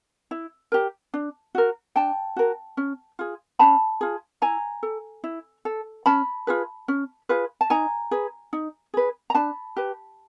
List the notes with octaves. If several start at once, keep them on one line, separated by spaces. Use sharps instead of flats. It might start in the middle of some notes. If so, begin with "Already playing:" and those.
E4
G4 A#4
D4
F#4 A#4
D4 G5 A5
F#4 A#4
C#4
F4 G#4
C#4 A5 B5
F4 G#4
E4 G#5 A#5
A4
E4
A4
C#4 A5 B5
F4 G#4 B4
C#4
F4 G#4 B4
A5
D#4 G#5 A#5
G#4 B4
D#4
G#4 B4
A#5
D4 A5 B5
G4 B4